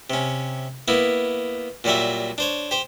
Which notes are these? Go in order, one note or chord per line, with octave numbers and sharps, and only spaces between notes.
C3 C#4
A#3 B3 E4
A#2 F#3 G3 F#4 E5
D4 C5 C#5
G4 C5